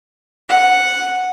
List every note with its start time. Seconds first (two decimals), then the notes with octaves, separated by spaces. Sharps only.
0.49 F#5